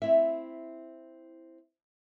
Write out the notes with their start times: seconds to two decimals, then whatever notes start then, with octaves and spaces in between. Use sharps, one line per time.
0.02 C4 E4 E5